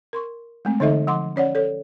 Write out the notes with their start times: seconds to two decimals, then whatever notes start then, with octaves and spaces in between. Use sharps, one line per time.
0.13 A#4 C6 C#6
0.65 G#3 A3 C4
0.80 D3 E3 D#4 A4 D#5 E5
1.07 F3 F#5 C6 D6
1.36 C#4 C#5 D5 F#5
1.55 A4 C#5